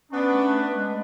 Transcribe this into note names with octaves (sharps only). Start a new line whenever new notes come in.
B3 C#4 D4
A3
B4
G#3